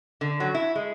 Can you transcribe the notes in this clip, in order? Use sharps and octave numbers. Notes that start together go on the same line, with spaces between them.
D3
F#3
E4
G#3